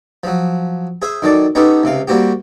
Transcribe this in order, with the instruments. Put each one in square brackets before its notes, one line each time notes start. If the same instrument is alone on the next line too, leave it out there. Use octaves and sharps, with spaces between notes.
[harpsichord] F3 F#3
G#4 C5 E5
D#3 F#3 A4 D5
B3 C#4 D#4 G4 A4
C#2 C3 F5
G3 A#3 C4 F#4 G4